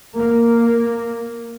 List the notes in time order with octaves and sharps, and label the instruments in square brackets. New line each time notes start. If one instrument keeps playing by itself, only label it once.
[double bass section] A#3